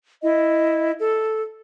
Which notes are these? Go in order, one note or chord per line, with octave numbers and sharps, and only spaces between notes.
E4 D#5
A4